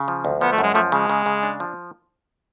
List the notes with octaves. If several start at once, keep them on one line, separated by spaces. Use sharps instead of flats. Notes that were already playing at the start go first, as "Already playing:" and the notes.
Already playing: C#3
F3
D2
F3 B3
A3
F#2 G#3
F3 A3
C#3 G#3
C#3
C#3
D4
F3